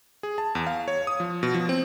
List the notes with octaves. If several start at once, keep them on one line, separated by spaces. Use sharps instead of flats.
G#4
A5
E2
F5
C#5
D#6
F3
B2
F3
C4